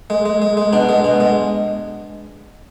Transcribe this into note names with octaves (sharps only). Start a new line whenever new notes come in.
G#3
G#3
G#3
G#3
B2 D4
G#3
B2
G#3